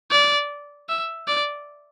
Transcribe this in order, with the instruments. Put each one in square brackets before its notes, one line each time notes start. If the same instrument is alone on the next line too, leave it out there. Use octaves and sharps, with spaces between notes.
[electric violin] D5
E5
D5